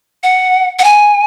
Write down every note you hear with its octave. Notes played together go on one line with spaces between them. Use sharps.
F#5
F#5
G#5